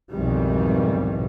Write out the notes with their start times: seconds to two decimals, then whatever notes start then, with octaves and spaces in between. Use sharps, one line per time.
0.10 B1 F2 G#2 D#3 E3 G3